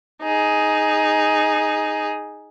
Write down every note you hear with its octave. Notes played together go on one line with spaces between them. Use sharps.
D#4 G#4